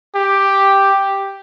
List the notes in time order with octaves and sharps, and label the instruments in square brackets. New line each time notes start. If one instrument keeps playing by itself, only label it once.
[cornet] G4